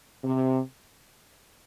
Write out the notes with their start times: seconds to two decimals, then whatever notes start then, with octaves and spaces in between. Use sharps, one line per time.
0.23 C3